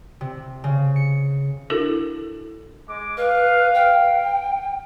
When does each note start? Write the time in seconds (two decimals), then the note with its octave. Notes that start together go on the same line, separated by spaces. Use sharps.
0.21 C3
0.64 C#3
0.96 C#7
1.70 D4 E4 F#4 A4 A#4
2.87 G#3 D6
3.17 B4 F5
3.74 G5